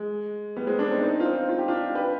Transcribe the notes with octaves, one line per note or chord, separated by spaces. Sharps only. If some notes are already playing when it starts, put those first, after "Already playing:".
Already playing: G#3
G3 B3
G#3 C4
B3 D4
C4 D#4
C4 D#4
F4
C4 D#4
F4
G4
D4 F4
G4 B4